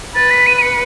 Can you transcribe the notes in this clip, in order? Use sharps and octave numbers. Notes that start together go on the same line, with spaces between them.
B4 A6
B6
D#7
D#7
C#7